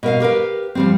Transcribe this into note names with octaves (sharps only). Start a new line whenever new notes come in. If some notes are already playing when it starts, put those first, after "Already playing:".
B2 A#4 E5 F5
G4 A#4 B4 F5
F3 G3 C4